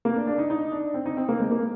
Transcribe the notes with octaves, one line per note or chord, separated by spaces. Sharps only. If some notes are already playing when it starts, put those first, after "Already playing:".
A#3
D4
D4
D#4
D#4
D4
C4
D#4
C4
A#3
G#3
A#3